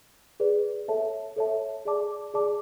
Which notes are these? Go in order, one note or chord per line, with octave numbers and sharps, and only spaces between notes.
G#4 B4 D5
A4 C#5 E5 A5
A4 C#5 E5 A5
G#4 D5 A5 D6
G#4 D5 A5 D6